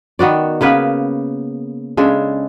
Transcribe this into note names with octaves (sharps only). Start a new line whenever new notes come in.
D#3 B3 F#4 D5
C#3 A#3 B3 B4
C#3 G#3 D4 A4